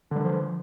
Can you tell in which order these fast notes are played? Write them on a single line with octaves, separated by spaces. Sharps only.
D3 G3 D#3 F3